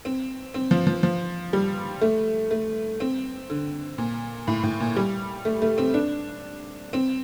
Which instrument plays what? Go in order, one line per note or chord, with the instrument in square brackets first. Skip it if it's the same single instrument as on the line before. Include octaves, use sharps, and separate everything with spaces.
[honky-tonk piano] C4
C4
F3
F3
F3
G3
A3
A3
C4
D3
A#2
A2
A2
A#2
G3
A3
A3
C4
D4
C4